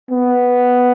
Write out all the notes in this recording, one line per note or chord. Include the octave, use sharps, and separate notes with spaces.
B3